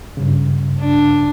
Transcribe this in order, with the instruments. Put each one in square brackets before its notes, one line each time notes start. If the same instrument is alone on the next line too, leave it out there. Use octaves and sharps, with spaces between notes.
[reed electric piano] G2 C#3
[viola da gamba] D4